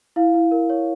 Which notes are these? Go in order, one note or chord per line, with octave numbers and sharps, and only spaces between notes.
E4 F5
E4
A#4
C#5